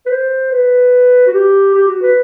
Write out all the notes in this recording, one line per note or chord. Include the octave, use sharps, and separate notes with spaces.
B4
C5
B4
F#4
G4
G4
F#4
B4